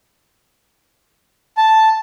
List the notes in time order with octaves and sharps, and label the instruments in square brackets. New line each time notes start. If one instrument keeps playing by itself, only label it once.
[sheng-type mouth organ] A5